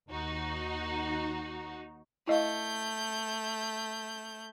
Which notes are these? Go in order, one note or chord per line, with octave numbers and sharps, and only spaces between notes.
D#2 D#4 F#4
A3 E4 D#5 F5 G6